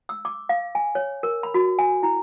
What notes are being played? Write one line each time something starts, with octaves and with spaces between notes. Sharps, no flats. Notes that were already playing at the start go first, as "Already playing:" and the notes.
E6
D6
F5
G#5
C#5
A#4
B5
F#4
G#5
E4